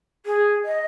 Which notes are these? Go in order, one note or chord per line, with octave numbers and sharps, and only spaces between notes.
G#4
D#5